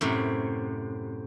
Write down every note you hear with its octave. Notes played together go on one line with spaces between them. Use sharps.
F#2 A2 C3